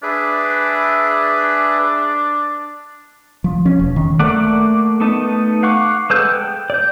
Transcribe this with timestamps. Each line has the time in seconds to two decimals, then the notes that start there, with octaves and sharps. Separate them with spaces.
0.03 D4 G#4 B4 E5
3.44 F3
3.65 C#4
3.79 E1
3.96 D#3
4.19 A3 A#3 D5 F#5
5.00 A3 B3 D#4 A5
5.63 F5 F#5 C#6 D6
6.10 G#3 A4 B4 G6
6.32 G5
6.70 D5 G6